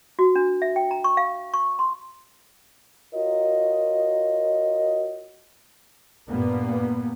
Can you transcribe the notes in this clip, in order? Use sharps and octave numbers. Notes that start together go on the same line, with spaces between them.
F#4
D4
E5
G5
A#5
C#6
F5
C#6
C6
F4 F#4 A#4 C#5 D#5
G2 A#2 A#3 B3